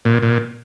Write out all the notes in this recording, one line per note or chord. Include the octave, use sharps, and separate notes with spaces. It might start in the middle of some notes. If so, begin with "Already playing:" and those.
A#2
A#2